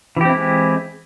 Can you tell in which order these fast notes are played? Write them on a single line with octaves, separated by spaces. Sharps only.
E3 G4 C4 E4 G#3